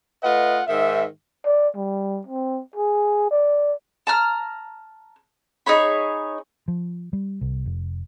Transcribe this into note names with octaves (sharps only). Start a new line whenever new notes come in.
A3 F4 B4 D#5 F#5
G#2 D#3 E5
D5
G3
C4
G#4
D5
A5 A#5 F6
D#4 G#4 C#5 B5
F3
G3
C2
F1